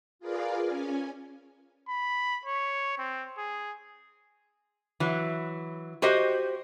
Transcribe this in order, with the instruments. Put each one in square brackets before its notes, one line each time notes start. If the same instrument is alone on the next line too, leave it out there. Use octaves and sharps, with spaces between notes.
[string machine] F4 G#4 A#4 B4 D5 F5
C#4 G#5
[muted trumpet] B5
C#5
C4
G#4
[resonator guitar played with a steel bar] E3 F#3
F#4 G4 C5 D#5